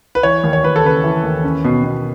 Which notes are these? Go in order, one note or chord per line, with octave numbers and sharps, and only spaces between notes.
B4
E3 C#5
D#2
C#5
D#2 B4
A4
C#3 B4
E3
D#2
C#4
B2
B2